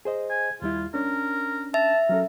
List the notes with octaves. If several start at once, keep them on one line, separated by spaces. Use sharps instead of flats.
G#4 C5 D#5
G#5
D#2 G3 E4 F4
C#4 D4 A#4
E5 A5
F#3 C#4 A4 A#4